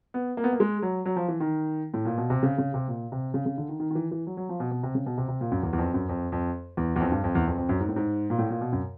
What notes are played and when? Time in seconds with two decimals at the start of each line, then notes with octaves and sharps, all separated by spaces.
0.14 B3
0.37 A#3
0.44 B3
0.53 A#3
0.60 G#3
0.82 F#3
1.06 F#3
1.16 F3
1.28 E3
1.40 D#3
1.94 A2
2.05 A#2
2.18 B2
2.30 C3
2.43 C#3
2.58 C#3
2.74 C3
2.88 A#2
3.12 C3
3.34 C#3
3.46 C#3
3.58 D3
3.69 D#3
3.80 D#3
3.91 D#3
3.95 E3
4.11 E3
4.27 F#3
4.37 F#3
4.49 F3
4.60 B2
4.71 B2
4.83 C3
4.95 C#3
5.06 B2
5.18 C3
5.29 C3
5.41 A#2
5.52 F#2
5.63 E2
5.73 E2
5.78 F2
5.94 F#2
6.09 F2
6.32 F2
6.77 E2
6.96 E2
7.00 F2
7.12 G2
7.24 F2
7.35 E2
7.47 F2
7.58 F2
7.69 F#2
7.80 G#2
7.89 A2
7.96 G#2
8.30 A#2
8.38 A2
8.50 A#2
8.61 B2
8.72 F#2